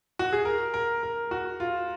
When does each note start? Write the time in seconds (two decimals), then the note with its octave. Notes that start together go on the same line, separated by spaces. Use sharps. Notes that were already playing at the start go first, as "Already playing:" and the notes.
0.19 F#4
0.33 G#4
0.45 A#4
0.74 A#4
1.03 A#4
1.31 F#4
1.60 F4